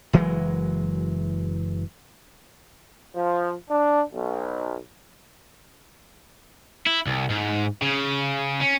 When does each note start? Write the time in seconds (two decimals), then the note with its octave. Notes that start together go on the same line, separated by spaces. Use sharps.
0.13 F#1 E3 F#3 G#3
3.15 F3
3.69 D4
4.13 B1
6.87 E4
7.07 C2
7.30 G#2
7.82 C#3
8.62 C#4